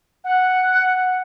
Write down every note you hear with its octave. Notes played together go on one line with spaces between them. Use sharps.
F#5